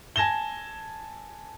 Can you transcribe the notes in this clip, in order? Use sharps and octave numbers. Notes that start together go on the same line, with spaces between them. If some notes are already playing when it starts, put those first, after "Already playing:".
G#5 A5 G#6 A#6 E7 G7